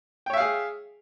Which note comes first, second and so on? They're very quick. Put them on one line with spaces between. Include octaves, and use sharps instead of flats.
G5 C#5 E5 F5 G#4